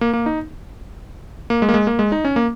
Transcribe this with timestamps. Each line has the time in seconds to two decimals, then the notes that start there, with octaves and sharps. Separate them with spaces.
0.01 A#3
0.13 A#3
0.26 D#4
1.50 A#3
1.62 G#3
1.69 A#3
1.74 G#3
1.87 A#3
1.99 G#3
2.12 D#4
2.25 C#4
2.36 A#3